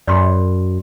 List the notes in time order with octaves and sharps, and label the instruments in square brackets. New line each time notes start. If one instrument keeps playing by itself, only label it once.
[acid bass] F#2 [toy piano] D5 B5 C6